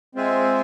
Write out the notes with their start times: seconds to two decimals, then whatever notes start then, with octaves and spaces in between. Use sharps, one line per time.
0.15 G#3 C4 F4 C5 E5 G#5